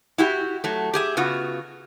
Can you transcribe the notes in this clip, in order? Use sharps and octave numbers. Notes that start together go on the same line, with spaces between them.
E4 F#4 G4
F#3 A3
G4 G#4 E5
C#3 B3 F4 F#4